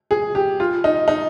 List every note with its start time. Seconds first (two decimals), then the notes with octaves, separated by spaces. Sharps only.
0.11 G#4
0.35 G4
0.60 F4
0.84 D#4
1.08 D#4